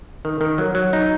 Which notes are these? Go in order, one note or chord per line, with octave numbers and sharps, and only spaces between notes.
D#3
D#3
F#3
F#3
D#4